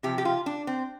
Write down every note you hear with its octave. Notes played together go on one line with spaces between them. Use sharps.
C3 F3 G4
G4
F4
D4
C4